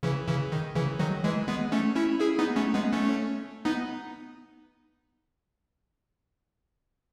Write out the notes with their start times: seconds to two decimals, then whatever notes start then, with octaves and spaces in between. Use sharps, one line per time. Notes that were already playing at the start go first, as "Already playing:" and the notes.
0.03 C#3 E3
0.27 C#3 E3
0.52 D#3
0.75 C#3 E3
0.99 D#3 F#3
1.24 E3 G#3
1.47 G#3 B3
1.72 A3 C#4
1.96 C#4 E4
2.20 E4 G#4
2.39 B3 D#4
2.56 A3 C#4
2.74 G#3 B3
2.93 A3 C#4
3.65 B3 D#4